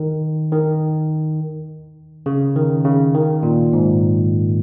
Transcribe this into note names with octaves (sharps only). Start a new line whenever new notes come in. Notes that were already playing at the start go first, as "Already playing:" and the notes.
Already playing: D#3
D#3
C#3
D#3
C#3
D#3
A#2
G#2